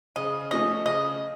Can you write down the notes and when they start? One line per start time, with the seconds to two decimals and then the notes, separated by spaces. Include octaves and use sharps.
0.16 C#3 D#5
0.51 F3 A3 C#4 D#5
0.85 C#3 D#5